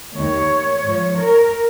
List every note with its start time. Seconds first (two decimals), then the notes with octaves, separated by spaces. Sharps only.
0.14 D#2 D#3 C#5
0.83 G#2 F3
1.18 A#4